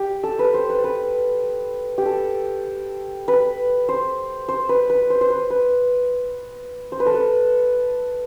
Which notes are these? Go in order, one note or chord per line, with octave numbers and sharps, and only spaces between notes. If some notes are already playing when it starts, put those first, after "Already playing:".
Already playing: G4
A4
B4
C5
B4
B4
G4
A4
B4
C5
C5
B4
B4
C5
C5
B4
B4
C5
B4
A4
B4